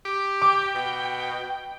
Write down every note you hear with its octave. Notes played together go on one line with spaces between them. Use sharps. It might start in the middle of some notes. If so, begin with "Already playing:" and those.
G4
G5 D6
B2